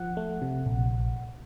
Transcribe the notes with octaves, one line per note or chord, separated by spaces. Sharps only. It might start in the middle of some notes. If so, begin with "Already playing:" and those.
Already playing: F3 F#5
A3
C3
A#1